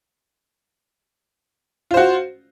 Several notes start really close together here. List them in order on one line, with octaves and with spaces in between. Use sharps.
F4 C5 F#4